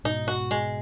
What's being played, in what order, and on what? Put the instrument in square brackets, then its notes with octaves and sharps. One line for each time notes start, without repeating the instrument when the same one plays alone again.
[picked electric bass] G#2 B2 [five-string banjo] D#4
[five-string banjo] F#4
G#3